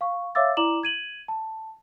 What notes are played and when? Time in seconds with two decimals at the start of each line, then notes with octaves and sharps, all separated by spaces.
0.01 F5 C#6
0.35 C#5 E5 F5 D6 E6 A6
0.57 E4 D5 A#5 D6 E7 F#7
0.83 G#6 D#7 F#7
1.28 A5